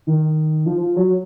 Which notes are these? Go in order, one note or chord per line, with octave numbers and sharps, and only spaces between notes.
D#3
F3
F3
F#3